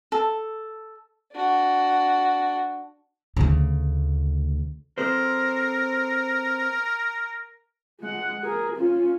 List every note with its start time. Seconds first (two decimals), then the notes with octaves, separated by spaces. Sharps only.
0.12 A4
1.33 D4 F#4
3.37 D2 C#3
4.98 C4 A4 A#4 C5
8.00 G#3 F#5
8.43 G#4 A#4
8.76 C#4 F4